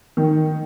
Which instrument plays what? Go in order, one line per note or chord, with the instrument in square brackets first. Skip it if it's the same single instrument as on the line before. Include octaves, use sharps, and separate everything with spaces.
[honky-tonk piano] D#3